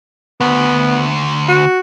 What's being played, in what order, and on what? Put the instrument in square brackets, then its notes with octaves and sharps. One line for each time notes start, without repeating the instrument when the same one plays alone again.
[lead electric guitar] D2 [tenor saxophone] B3
[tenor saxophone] F#4